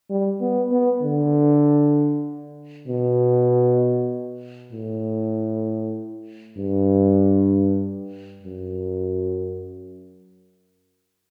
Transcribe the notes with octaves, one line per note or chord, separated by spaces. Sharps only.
G3
B3
B3
D3
B2
A2
G2
F#2